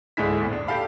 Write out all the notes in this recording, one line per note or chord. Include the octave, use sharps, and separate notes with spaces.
D1 G#2 D3 G#3 E4 B6
A#1 E2
D4
G4 A4 F5 B5